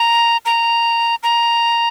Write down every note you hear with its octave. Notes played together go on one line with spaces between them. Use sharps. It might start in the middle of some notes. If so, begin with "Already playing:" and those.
Already playing: A#5
A#5
A#5